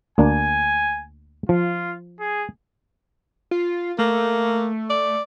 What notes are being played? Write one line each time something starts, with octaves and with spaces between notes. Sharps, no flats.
D2 A#3 D4 G#5
F3 F4
G#4
F4
A3 A#3
D5